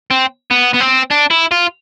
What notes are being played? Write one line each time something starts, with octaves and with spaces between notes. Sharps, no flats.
C4
B3
B3
C4
D4
E4
F4